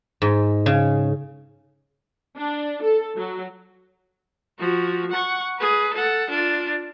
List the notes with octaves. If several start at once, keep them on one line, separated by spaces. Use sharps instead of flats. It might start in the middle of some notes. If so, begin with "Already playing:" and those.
G#2
C#3
D4
A4
F#3
F3 F#4
F#5 C#6
G#4 B4
A4 F#5
D4 F4